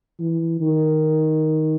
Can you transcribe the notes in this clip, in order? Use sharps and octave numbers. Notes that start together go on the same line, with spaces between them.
E3
D#3